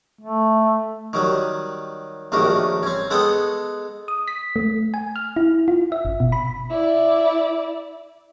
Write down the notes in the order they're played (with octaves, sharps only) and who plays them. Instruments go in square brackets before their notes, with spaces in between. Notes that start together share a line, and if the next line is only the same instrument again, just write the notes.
[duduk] A3
[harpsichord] D#3 F#3 G3
A#1 A2 D#3 G3 F#4 G4
C4 C#4
G#3 B3 A4 F#5 G5 D#6
[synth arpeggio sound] D#6
B6
A3
G#5
F6
E4
F4
E5
G1
B2
B5
[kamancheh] E4 D5